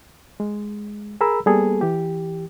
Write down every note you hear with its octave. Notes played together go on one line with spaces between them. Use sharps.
G#3
G#4 A#4 A#5 B5 E6
G3 A#3 B3 G#4 A4
E3 G4